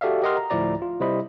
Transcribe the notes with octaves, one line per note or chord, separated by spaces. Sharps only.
F#4 G4 A4 D5 E5 F5
G4 A#4 D#5 F#5 C6 F6
A#5
D2 A2 F3 E4 D5 A#5
F4
C3 G3 E4 C5 D#5 B5